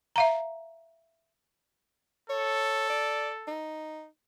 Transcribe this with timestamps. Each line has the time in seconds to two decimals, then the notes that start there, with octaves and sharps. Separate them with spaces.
0.16 E5 F5 A#5
2.30 A4 C#5
2.89 D5
3.47 D#4